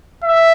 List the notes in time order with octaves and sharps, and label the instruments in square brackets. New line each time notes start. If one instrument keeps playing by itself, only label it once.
[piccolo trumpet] E5